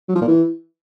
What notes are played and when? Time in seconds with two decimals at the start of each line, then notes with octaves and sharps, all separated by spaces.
0.09 F#3
0.15 F3
0.21 A#2
0.28 E3